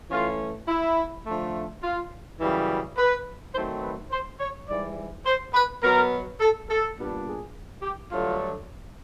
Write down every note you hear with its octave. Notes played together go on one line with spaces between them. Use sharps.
E3 A3 C#4 F4
E4
D3 F3 A3
F4
F#2 C#3 E3 G3
B4
D#3 F#3 A3 C4 C5
B4
C5
C#5
G#2 E3 G3 D5
C5
B4
B2 F#3 B3 A#4
A4
A4
A#2 G3 B3 D4
G#4
G4
G2 D3 F#3 A3 F4